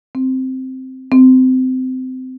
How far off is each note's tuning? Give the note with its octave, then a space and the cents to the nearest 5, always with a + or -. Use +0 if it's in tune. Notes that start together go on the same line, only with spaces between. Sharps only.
C4 -5
C4 -25